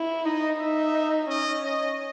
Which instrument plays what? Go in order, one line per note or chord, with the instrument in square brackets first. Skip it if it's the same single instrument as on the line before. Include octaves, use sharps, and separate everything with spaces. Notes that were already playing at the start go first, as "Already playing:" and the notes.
Already playing: [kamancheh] E4
[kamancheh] D#4 [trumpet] D#5
[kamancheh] D#4 [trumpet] E5
[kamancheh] C#4 [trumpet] D#5
[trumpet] D#5